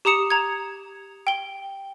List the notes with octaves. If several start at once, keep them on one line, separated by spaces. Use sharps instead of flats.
G4 A#5 D#6 C#7 E7
A#5 G#6
G5 G7